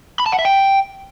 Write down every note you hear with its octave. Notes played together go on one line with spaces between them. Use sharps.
B5
A5
F#5
E5
G5